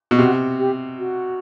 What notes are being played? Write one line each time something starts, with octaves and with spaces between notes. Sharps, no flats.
B2
C3 F#4
G4
F#4